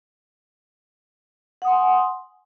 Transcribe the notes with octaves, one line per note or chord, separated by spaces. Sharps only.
F#5 G#5 C6 D#6